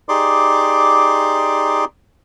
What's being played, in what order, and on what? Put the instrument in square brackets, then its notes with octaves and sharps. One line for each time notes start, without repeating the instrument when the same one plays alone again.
[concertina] D#4 G4 G#4 D5 C6 D6